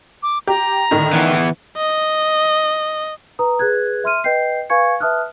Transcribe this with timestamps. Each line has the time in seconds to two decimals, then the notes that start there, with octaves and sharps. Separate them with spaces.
0.23 D6
0.47 G4 A#5
0.91 A2 D3 D#3
1.13 E3 B3
1.77 D#5
3.39 B4 A#5 D#6
3.59 G#4 B4 F#6 G#6
4.04 E5 C6 F6 D#7
4.24 B4 D#5 G5 G6 C7
4.70 B4 F5 G#5 C#6 G#6 C#7
5.00 B4 E5 A5 D#6 F6 F#6